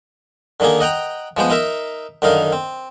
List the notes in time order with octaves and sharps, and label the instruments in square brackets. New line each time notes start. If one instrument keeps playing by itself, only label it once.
[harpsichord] D3 D#3 A#3 D#4 G#4
D#5 F#5 G5 A#5
F3 G#3 B3 C5
D#4 A#4 E5
F#2 D3 D#3 D#4 F5
C4